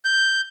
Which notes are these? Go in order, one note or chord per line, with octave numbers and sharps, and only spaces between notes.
G6